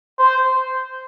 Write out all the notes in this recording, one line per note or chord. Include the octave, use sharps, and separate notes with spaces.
C5